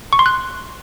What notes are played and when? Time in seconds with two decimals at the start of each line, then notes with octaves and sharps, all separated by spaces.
0.13 C#6
0.19 C6
0.26 F#6